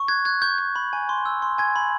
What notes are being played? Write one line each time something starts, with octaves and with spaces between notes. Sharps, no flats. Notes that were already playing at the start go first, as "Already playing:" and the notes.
Already playing: C#6
F#6 G#6
F#6 G#6
C#6 G6
G6
B5
G#5
C6
E6
C6
G#5 G#6
B5